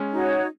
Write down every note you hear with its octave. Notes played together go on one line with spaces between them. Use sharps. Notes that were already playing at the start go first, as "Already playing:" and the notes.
Already playing: G#3 C#4
D#4 F#4 C#5